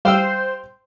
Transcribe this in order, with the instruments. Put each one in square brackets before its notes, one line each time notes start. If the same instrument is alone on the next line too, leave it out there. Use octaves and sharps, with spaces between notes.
[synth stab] G3 [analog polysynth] C5 [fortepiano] F5 G5 E6